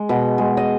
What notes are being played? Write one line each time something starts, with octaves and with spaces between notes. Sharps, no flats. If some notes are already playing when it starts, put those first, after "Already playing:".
Already playing: G#3
B2
G#3
D#5